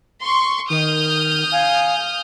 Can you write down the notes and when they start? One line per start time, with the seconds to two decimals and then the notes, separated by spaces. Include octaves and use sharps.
0.23 C6 C#6
0.70 D#3 D#6 F6 G6
1.52 F5 G#5